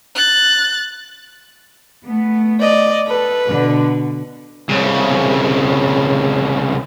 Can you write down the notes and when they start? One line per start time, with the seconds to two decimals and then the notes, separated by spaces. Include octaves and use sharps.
0.15 F#6 A6
2.05 A3 B3
2.60 D5 D#5
3.07 A4 B4
3.47 B2 D3
4.70 C2 C#3